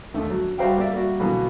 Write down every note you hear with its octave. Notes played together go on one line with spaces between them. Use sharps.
D#2 D3 A3
F#3
G3 F#4 C5 E5 F5 G5
A#3 D5 E5
G3 A#3 F#4
B2 D3 E3 F#3 A#3 B3